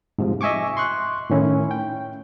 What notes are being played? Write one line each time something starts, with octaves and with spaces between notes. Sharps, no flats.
G#2 C3 F3
D#5 E5 G#5 C#6 D6
C6 C#6 F#6
A2 D#3 C#4 E4
G5